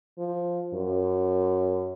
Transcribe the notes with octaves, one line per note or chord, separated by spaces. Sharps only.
F3
F#2